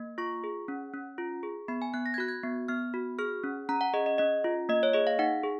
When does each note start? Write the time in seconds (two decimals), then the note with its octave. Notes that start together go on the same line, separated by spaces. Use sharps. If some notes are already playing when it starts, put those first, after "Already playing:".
Already playing: A#3
0.18 F4 C#6
0.44 G#4
0.68 C#4
0.94 C#4
1.18 F4
1.43 G#4
1.68 B3 B5
1.82 G#5
1.94 B3 F#6
2.06 A#6
2.14 G#6
2.18 F#4 F#6
2.28 G#6
2.43 B3
2.68 B3 F6
2.94 F#4
3.19 G#4 F6
3.44 C#4
3.69 C#4 A#5
3.81 F#5
3.93 G#4 D#5
4.06 D#5
4.18 C#4 D#5
4.44 F4
4.69 A#3 D#5
4.83 C#5
4.93 G#4 D#5
5.07 F5
5.19 D#4 F#5
5.43 G#4